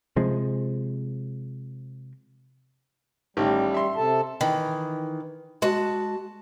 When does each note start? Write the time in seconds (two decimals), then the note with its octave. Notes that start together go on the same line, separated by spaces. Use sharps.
0.16 C3 F3 G#3
3.37 A1 D#3 G3 G4
3.74 E5 C6
3.97 C3 A4 A5
4.41 D#3 E3
5.62 G#3 F#4 A5